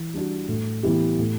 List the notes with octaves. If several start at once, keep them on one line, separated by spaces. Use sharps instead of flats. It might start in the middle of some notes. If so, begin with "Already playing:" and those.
Already playing: E3
G3 D4 F#4
A2
E3 B3 E4 G4
A2